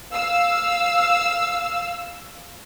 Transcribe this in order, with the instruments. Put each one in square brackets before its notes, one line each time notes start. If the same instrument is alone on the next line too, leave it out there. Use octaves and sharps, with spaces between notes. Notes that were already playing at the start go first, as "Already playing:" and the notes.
[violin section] F5 E6